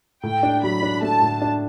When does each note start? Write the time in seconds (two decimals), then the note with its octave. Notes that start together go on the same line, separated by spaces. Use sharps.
0.23 A2 G5
0.43 D4
0.63 F#3 B5
0.83 D4
1.02 A3 A5
1.22 A2
1.41 D4